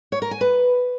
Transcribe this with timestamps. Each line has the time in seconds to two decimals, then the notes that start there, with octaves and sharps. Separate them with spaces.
0.12 C#5
0.22 A#4
0.31 G#5
0.41 B4